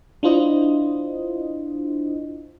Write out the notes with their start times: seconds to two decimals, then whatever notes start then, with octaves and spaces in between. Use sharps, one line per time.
0.23 D4 E4 F4 C5 D#5